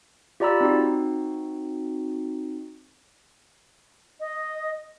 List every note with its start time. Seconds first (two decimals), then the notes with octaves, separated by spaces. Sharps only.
0.40 F4 G4 D5 A#5 B5 E6
0.61 C4 D#4 F#4
4.20 D#5